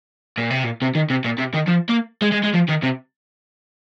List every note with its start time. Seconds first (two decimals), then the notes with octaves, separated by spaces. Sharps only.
0.38 A#2
0.50 C3
0.64 A#2
0.82 C3
0.95 D#3
1.10 C3
1.24 A#2
1.38 C3
1.54 D#3
1.67 F3
1.89 A#3
2.22 G#3
2.32 G#3
2.43 G#3
2.54 F3
2.68 D#3
2.83 C3